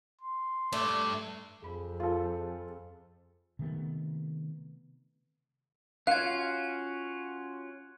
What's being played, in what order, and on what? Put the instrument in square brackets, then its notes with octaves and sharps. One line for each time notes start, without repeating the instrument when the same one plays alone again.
[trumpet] C6
[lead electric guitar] G2 [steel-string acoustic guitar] A3 [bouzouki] D5
[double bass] F2 [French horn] G#4 [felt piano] B5
[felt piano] F4 A4
[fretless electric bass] C3 D#3 A3 B3
[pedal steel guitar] C#4 F4 F#4 [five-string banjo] F5 [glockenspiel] F#6 G#6